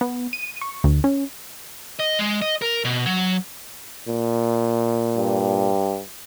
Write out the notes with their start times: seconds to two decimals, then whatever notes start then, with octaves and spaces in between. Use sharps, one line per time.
0.01 B3
0.33 D#7
0.61 C#6
0.84 D2
1.04 C#4
2.00 D#5
2.19 G#3
2.42 D#5
2.62 A#4
2.85 B2
3.06 F#3
4.08 A#2
5.18 G2